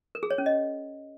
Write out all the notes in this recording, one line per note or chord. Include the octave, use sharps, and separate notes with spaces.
A#4
G#4
C#5
C#4
D#5